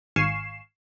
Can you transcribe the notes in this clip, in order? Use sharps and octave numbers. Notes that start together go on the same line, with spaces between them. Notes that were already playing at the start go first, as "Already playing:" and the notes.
G#1 F5 G#5 C#6 C7 E7